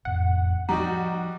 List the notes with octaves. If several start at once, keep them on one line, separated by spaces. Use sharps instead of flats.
E1 F2 A2 F#5
F3 G3 D#4 F#4 A#5